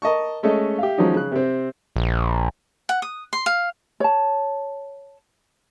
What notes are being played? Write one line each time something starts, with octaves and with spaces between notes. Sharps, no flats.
A#4 D#5 A5 C#6
G#3 A3 C#4 A4 D#5
G4 E5 F5
D#3 F3 F#3 G#3 C#4 D#4
C#3 F#6
C3 C4
A#1
F#5
D#6
C6
F5
C#5 A5